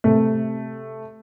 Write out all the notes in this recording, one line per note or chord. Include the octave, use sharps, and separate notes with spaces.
C3 A3